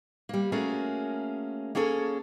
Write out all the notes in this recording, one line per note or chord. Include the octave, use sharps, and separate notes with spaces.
G3 A#3
A3 A#3 C#4 F#4 G#4 A#4
A#3 C#4 G#4 A4 C#5